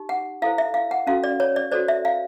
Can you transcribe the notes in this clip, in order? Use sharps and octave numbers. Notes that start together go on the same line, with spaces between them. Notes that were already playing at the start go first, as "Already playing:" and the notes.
Already playing: D#4 G4
F#5
E4 A4 C5 F5
E5
F5
F#5
C#4 F#4 A4 F5
D5
C#5
D5
F#4 A4 C5 D5
E5
F5